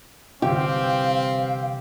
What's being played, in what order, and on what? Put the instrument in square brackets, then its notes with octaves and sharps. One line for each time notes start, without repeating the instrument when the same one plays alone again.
[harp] G1 C3 E3 [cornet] C4 [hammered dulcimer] G4 [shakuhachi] F5